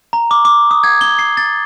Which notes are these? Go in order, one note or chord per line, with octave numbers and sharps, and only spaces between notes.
A#5
D6
D6
D#6
G#6
G7
C7
A6